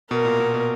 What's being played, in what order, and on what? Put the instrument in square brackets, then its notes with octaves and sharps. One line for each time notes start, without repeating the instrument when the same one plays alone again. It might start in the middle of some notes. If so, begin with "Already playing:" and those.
[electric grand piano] B2 [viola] A#4
[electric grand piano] A#2
B2
B2